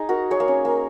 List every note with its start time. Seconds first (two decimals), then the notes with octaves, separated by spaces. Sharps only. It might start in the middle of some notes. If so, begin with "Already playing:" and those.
Already playing: D#4 G#4
0.09 F#4 A#4
0.31 G#4 C#5
0.40 A#3
0.48 C#4
0.65 A#3